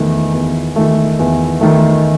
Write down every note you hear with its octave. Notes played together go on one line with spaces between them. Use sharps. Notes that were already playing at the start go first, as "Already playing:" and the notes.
Already playing: E2 D#3 A3
E2
D#3 A3
E2
D#3 A3